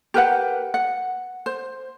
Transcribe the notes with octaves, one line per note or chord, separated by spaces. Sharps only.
G4 A#4 B4 F#5
F#5
C5